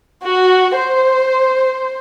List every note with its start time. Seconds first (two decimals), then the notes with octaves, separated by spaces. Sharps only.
0.24 F#4
0.74 C5